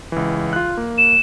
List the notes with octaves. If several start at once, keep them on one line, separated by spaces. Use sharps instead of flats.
C#2 E3
F4 F#6
A#3
E7